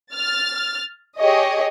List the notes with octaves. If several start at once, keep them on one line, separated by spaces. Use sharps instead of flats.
F6 A6
G4 G#4 C#5 D#5